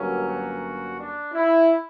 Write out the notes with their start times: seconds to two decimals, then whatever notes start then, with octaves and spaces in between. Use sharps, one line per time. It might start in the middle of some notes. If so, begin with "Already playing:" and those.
Already playing: G1 G2 F#3 A#3 C#4 A#4
0.27 F#4
0.97 D4
1.33 E4